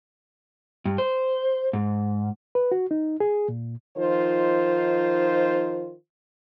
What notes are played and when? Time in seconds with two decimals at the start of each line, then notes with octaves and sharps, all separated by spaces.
0.85 G2
0.98 C5
1.73 G#2
2.55 B4
2.72 F#4
2.91 D#4
3.20 G#4
3.48 A#2
3.98 D#3 F3 D#4 F4 C5